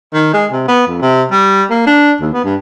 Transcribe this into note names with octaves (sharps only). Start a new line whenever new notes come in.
D#3
G#3
C3
B3
F2
C3
G3
A#3
D4
D#2
B3
G2